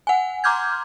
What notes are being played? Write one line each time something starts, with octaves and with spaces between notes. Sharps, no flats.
F#5 G#5
A#5 C6 D6 F6 G6 G#6